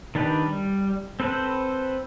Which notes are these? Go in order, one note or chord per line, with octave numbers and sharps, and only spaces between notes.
D#3 D4 G4 B4
G3
C4 A4 B4 C5